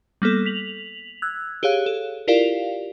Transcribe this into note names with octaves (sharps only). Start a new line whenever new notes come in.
G3 A#3 B3 A4
B6 F7 F#7
E6 F#6 G#6
G4 G#4 C#5 F5 F#6
A4
E4 F4 G4 A#4 D5 F5